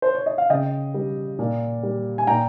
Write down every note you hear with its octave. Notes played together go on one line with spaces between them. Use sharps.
C5
C#5
D#5
F5
C#3 D#5 G5
G3
A#2
G3
G#5
A#2 G5 A#5